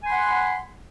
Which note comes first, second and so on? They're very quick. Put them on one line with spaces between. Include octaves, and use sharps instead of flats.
G#5 C6 B5 F#5